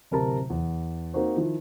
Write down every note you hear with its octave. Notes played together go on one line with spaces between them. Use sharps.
D1 C3 G4 A#4 A5 A#5
E2
A#3 C4 D#4 F#4 C5
D#3 F3 E4